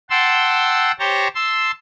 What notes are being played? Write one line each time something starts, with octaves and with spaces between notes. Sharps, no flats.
F#5 G5 A5 C6 E6
G4 C5 C#5 G5 A5 A#5
A5 C6 E6